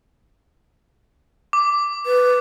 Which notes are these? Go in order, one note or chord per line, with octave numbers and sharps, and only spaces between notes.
D6
B4